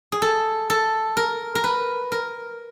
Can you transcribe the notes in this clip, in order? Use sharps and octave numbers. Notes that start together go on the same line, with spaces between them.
G#4
A4
A4
A#4
A#4
B4
A#4